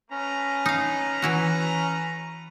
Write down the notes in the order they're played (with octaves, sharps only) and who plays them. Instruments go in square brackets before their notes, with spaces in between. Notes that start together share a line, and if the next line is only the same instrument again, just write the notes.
[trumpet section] A3 B4 A#5 [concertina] C#4
[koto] D#4 F5
E3 E4 F#4